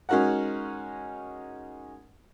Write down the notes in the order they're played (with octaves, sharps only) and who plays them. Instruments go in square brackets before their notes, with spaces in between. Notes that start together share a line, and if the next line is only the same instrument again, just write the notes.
[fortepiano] G#3 C#4 D#4 F#4 A#4 F#5